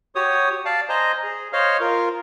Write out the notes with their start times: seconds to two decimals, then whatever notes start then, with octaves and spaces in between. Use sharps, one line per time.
0.15 F#4 G4 C#5 D#6
0.65 D5 F5 A5
0.89 C5 D#5 G#5 A#5
1.23 G#4
1.53 C5 C#5 D#5 F5 F6
1.80 F4 A#4